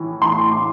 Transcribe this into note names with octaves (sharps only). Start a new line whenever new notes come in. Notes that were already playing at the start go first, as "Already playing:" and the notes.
Already playing: A2 E3
A2 C6
A2 D6